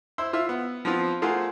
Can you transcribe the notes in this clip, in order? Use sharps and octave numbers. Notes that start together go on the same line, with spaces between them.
E4 C5 E6
F4 E5
B3
F3 B3 C4 F4
A3 F4 F#4 G#4 A#4 C5